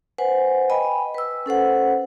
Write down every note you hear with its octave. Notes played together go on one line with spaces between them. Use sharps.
B4 C5 F#5 G#5
D#5 G5 G#5 B5
B4 E6
C#4 A4 C5 F#5